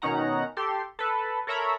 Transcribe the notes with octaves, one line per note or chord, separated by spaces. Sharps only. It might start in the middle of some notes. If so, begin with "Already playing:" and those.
B2 D#3 C#4 D#4 F#5 A#5
G4 A4 C6
A4 B4
A4 A#4 C#5 E5 A#5 B5